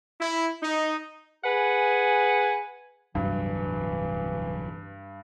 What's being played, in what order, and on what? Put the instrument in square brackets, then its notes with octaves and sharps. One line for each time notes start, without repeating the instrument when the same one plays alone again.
[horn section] E4
D#4
G#4 B4 F#5 G#5
[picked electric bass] D1 C2 F#3 [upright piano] G2 [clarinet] E3